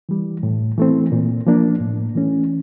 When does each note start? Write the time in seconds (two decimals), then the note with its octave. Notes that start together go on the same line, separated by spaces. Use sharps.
0.09 E3 G3
0.43 A2
0.77 E3 A3 C4
1.12 A#2
1.47 F3 A#3 D4
1.80 A2
2.15 E3 A3 C#4